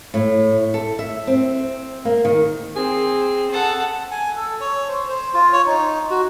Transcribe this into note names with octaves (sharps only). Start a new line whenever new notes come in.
A2
A4
E5
C4
A#3
D#3
C4 G#4
A4 F#5
G#5
A4
C#5
C5
C5
F4
C#5
D#4
F#4